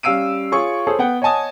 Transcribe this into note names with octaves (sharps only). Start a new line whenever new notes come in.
G3 C#4 F5 E6 D7 D#7
F4 G#4 C#5 C#6
G#4 A4 C5 C#5
B3 F#5 G5
C#5 D#5 F#5 G#5 A5 D#6